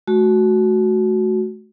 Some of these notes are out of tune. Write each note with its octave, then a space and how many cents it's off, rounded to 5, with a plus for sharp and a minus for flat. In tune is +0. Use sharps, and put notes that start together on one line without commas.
A3 -35 F#4 +0